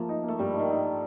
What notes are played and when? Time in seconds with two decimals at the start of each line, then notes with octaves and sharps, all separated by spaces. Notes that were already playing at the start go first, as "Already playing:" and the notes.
Already playing: F3 A3 A#3
0.09 D#4
0.23 A3 A#3
0.39 G2 G3
0.55 D#3 D#4
0.70 D#4